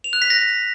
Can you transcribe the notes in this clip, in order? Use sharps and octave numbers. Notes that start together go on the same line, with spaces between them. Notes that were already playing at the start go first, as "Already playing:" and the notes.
F7
F#6
B6
A#6